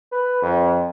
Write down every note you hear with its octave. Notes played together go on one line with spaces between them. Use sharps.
B4
F2